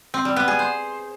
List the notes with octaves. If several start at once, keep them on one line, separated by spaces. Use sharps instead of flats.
C4
G3
B3
G#4
C5